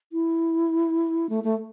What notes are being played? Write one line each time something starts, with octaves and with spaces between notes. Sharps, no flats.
E4
A3
A3